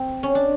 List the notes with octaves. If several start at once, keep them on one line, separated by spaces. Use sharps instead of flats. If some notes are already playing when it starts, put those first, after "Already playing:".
Already playing: C4
C#4
D4